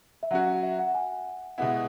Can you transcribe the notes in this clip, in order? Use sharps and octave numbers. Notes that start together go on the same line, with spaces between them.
E5
F#3 C#4 F#4 F#5
F#5
E5
F#5
G#5
B2 G#3 B3 E4 F#5